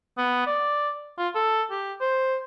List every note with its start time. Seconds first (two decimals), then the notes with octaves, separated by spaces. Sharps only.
0.18 B3
0.47 D5
1.18 F4
1.35 A4
1.71 G4
2.01 C5